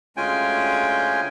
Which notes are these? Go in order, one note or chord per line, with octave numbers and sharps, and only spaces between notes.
D2 G#3 C#4 F4 G5 G#5